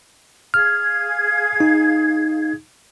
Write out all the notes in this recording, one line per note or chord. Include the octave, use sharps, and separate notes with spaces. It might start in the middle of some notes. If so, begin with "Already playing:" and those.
G#4 F5 F6 G#6
D#4